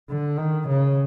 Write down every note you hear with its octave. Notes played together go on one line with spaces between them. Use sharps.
D3
D#3
C#3